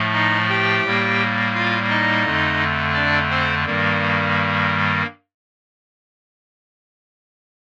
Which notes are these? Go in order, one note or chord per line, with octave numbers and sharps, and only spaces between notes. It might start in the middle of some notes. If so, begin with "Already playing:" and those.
Already playing: A2 F3 A3
D#4 D#5
G4 G5
A2 G3 A#3
F4 F5
D#4 D#5
F2 D3 A3
D4 D5
C4 C5
G2 D#3 G3 A#3